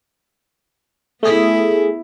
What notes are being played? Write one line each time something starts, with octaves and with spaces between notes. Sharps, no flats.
A3 B3 E4 G#4